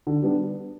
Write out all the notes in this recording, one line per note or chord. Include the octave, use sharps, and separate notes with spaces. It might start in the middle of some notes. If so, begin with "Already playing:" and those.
D3
G3 B3 D4